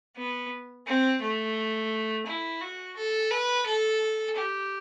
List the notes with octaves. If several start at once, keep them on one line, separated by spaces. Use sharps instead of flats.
B3
C4
A3
E4
F#4
A4
B4
A4
G4